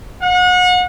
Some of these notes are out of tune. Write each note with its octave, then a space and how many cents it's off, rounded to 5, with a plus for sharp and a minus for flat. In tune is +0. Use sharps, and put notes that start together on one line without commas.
F#5 -35